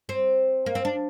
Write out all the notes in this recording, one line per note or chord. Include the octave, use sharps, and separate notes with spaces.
C4
A#3
C4
D4